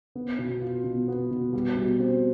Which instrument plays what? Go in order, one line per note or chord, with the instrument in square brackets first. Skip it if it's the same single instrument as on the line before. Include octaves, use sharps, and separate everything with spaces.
[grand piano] B3
B2
F4
B2
B3
B2
G3
B2
C4